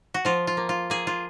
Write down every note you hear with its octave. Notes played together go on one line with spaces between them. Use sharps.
F#4
F3 F4
F4
A#3
F4
A#3 G#4
F4